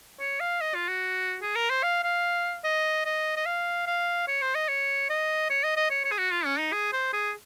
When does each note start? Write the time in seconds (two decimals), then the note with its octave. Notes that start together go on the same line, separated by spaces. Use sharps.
0.20 C#5
0.40 F5
0.61 D#5
0.75 F4
0.88 F#4
1.42 G#4
1.56 A#4
1.70 C5
1.83 F5
2.04 F5
2.64 D#5
3.06 D#5
3.37 D#5
3.46 F5
3.87 F5
4.28 C#5
4.42 C5
4.55 D#5
4.69 C#5
5.10 D#5
5.50 C#5
5.64 D#5
5.77 D#5
5.91 C#5
6.05 C#5
6.11 G#4
6.19 F#4
6.32 F4
6.45 C#4
6.59 D#4
6.72 G#4
6.93 C5
7.13 G#4